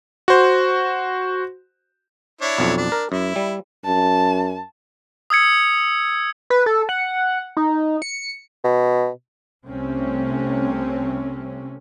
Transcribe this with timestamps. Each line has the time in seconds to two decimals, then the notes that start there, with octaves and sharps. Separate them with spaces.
0.28 F#4 C5
2.41 D4 E4 C#5
2.58 B1 F2
2.77 D4
2.92 A#4
3.12 F#2 E4
3.36 G3
3.85 F#2 A5
5.30 D#6 E6 G#6 C#7
6.50 B4
6.66 A4
6.89 F#5
7.57 D#4
8.02 C#7
8.64 B2
9.65 C2 C3 A3 C4 C#4